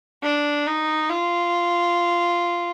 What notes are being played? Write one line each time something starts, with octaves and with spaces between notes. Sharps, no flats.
D4
D#4
F4